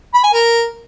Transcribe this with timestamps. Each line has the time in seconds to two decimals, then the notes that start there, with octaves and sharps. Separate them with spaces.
0.14 B5
0.24 G#5
0.33 A#4